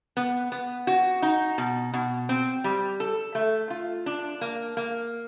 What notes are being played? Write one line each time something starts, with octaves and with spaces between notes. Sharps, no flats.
B3
B3
F#4
D#4
B2
B2
C4
G3
A4
A3
F4
D4
A#3
A#3